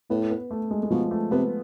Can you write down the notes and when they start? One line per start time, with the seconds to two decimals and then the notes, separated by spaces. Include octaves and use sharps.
0.10 A2 B3
0.30 B3
0.51 A3
0.71 G#3
0.83 G#3
0.91 B2 F3
1.11 A3
1.31 C3 B3